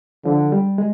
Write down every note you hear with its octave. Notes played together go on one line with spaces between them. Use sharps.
D3 F3
G3
G#3